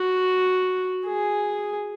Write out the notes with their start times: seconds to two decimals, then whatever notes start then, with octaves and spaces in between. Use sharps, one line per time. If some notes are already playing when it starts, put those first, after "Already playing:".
Already playing: F#4
1.05 G#4